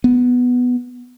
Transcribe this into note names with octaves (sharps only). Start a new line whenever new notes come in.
B3